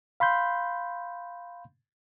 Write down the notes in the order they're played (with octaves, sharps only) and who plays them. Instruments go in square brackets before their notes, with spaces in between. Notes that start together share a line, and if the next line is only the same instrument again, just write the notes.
[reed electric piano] F5 B5 C6 G6